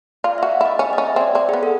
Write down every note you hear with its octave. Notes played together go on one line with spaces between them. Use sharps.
F4 D5
F5
F#4 E5
F5
E4 D#5
C#4 D#5
D#5
C#4
E5
C4 D5
C4 D5
B3 G#4
A4